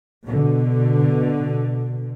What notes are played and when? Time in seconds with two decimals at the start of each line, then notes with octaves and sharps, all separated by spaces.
0.24 B2 D3